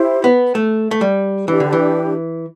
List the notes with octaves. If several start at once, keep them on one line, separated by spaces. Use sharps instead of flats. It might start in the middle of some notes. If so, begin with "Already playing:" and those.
Already playing: E4 G4 C5
B3
A3
A3
G3
E3 D4 G4 B4
D3
E3